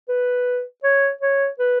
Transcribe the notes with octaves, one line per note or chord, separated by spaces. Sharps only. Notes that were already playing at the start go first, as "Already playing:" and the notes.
B4
C#5
C#5
B4